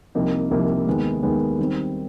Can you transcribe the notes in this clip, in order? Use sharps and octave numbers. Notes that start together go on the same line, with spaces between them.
C2 C3 F3 A#3 D#4
C2 C3 F3 A#3 D#4
D#2 D#3 G#3 B3
D#2 D#3 G#3 B3
D#3 G3 C4